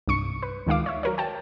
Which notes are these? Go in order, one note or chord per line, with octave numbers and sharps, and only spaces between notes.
C2 G2 C#6 C#7
B4
D2 D#3 G#3 F4 F5 D6
C#5 E5
F#3 A#4 C#5
G5 A5